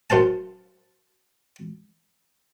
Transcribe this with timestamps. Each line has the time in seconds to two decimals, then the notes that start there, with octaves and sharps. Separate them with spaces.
0.10 F#2 C5 F5 A5